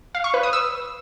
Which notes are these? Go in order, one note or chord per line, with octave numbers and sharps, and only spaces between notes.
F5
C#6
B4
D#6
E6